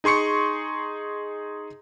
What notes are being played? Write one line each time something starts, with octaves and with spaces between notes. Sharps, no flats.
D#4 G#4 C6 C#6 C#7